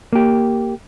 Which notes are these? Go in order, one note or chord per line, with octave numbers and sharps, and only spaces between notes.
A#3 G4